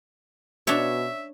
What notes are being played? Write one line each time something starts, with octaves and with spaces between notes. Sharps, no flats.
B2 D4 C#5 E5